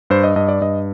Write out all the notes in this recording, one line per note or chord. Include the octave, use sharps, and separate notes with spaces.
G2 C5
D#5
G2 D#5
D5
G2 D#5